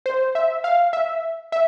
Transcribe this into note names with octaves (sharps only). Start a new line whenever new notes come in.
C5
E5
F5
E5
E5